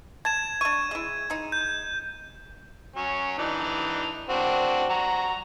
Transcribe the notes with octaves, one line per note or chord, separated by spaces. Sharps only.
A5 G#6 E7
D4 C#6 D#7
G#3 E4
G#3 D#4
G6
F#3 C#4
E3 D4 D#4
C4 D4 F#4
F#4 A#5